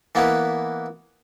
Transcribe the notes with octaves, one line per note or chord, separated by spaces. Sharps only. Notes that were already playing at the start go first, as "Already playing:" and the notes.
E3 A#3 B3 E4